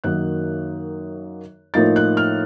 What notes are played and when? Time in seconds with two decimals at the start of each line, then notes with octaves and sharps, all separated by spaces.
0.04 F#2 D#3 F#3 A#3 D#4 F#6
1.74 A2 F3 A#3 D#4 A6
1.96 F#6
2.17 F6